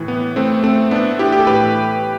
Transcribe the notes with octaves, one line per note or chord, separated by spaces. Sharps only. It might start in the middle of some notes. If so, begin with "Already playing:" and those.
Already playing: A2 E3
B3
A3 C4
A3 C4
B3 D4
E4 G4
G4
A4
A2 E3 G4 B4